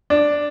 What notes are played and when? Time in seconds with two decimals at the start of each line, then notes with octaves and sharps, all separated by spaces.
0.10 D4